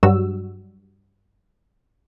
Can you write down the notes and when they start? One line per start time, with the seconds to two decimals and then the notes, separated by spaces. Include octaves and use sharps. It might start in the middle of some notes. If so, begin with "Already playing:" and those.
0.03 G2 F#3 G3 F#4 E6